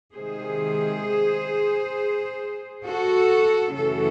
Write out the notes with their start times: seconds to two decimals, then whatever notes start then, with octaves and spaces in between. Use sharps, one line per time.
0.13 C3 D#3 G#3 G#4 C5
2.84 F#4 A4
3.74 F#2 C#3 E3 A3 F#4 A4